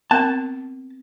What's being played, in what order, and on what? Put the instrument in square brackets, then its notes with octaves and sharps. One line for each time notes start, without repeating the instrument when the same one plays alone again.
[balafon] B3 C4 A#4 [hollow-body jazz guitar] A5